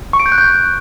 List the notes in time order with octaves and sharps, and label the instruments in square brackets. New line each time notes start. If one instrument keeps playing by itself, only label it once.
[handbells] C#6
D7
G6
F#6
G6